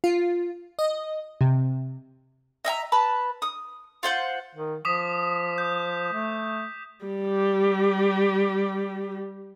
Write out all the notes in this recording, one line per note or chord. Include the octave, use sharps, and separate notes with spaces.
F4
D#5
C3
D#5 E5 G5 A#5
B4 A5 B5
D#6
F4 C5 F#5 G6
D#3
F3 D6 D#6 B6
G6
A3
G3 G4